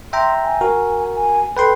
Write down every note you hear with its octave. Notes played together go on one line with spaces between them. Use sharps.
E5 G5 A#5 C6
G#5
F#4 A#4
G#5
A4 B4 G5 C6